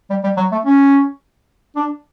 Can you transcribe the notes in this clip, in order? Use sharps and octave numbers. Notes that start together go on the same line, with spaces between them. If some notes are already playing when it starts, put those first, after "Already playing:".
G3
G3
F#3
A3
C#4
D4